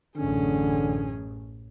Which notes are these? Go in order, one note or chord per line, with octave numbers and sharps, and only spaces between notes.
A1 F#2 D3 C#4 G#4